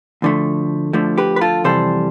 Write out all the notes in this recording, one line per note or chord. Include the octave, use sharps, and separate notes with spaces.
D2 D3 F3 A3
D2 D3 F3 A3
G4 B4
B4
F4 A4
F2 C3 E3 G3 A4 C5